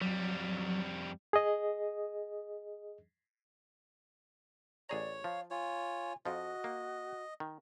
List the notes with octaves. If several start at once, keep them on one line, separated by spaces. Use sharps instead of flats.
F2 F#3 G3
G#4 D#5
A1 G#4 C#5 D5 A#5
F3 F5
F4 C#5 G#5
F2 F3 F#4 D#5
A#3
D#3